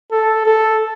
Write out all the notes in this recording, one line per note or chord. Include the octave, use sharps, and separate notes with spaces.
A4
A4